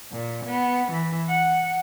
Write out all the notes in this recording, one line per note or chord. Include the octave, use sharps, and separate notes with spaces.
A#2
B3
E3
F#5